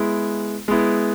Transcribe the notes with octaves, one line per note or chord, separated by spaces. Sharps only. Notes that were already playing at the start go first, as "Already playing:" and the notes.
Already playing: G#3 B3 E4
G#3 B3 E4